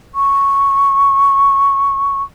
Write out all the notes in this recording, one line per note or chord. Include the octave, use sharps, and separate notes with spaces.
C#6